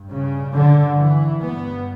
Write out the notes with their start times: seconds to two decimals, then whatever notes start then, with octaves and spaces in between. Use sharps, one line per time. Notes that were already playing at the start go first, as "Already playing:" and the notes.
Already playing: G2
0.11 C#3
0.54 D3
0.98 E3
1.41 G2 B3